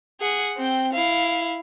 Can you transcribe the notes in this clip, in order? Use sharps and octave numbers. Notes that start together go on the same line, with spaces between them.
G#4 F#5
C4 G5
E4 F5